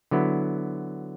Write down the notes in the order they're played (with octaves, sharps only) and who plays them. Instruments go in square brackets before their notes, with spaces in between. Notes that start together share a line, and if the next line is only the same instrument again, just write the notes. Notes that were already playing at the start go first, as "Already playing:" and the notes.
[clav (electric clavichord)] D3 F#3 B3 E4